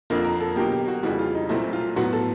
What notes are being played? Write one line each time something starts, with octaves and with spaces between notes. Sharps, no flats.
F2 D3 F3 A#3
A#4
A4
B2 F#3 A#3 G4
G4
F#4
F2 C#3 E3 G3 F#4
F4
D#4
C2 A#2 F#3 A3 C4 E4
F4
A2 F#3 B3 F#4
A4